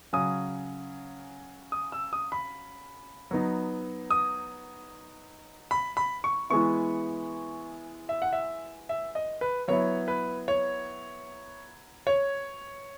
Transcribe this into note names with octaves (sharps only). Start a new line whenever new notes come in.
C#3 F#3 C#4 D#6
D#6
E6
D#6
B5
F#3 B3 D#4
D#6
B5
B5
C#6
E3 G#3 B3 E4 C#6
E5
F#5
E5
E5
D#5
B4
F#3 B3 E4 C#5
B4
C#5
C#5